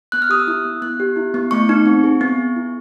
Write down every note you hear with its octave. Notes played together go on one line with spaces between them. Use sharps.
B3 F#6
F6
G4 D#6
E6
E4 F#6
B3
B3 F#6
G4
E4
B3
A3 C#6
D#4
C4
G#4
B3
G#4
E4